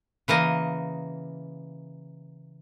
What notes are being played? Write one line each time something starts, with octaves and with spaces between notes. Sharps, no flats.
C#3 E3 A#3 D#5